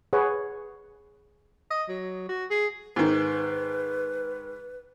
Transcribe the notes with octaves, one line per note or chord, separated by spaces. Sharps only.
G#4 B4 C#5 F#5
D#5
F#3
F#4
G#4
G#2 D#3 B4